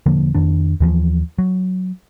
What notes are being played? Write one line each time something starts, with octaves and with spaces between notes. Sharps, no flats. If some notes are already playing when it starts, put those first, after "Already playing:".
E1 D3 F3 A#3
F2 D#3 D4
D#2 E3 F3
F#3